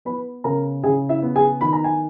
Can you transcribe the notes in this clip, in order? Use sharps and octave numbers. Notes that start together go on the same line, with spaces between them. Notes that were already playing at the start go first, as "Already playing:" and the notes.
B3 B4 B5
C#3 A#4 A#5
C#3 G#4 G#5
E4 E5
B3
G#4 G#5
D#3 B5
A#5
G#5